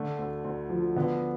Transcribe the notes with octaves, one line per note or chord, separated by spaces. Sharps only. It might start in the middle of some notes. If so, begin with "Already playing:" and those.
Already playing: D3 A3
D2
D2
F3
D3 B3